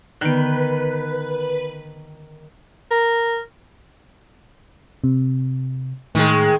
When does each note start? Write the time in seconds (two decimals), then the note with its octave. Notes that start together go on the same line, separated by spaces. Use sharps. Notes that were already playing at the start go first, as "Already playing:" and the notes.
0.21 D3 D#3 B3 B4
2.91 A#4
5.04 C3
6.15 A2 D#3 G#3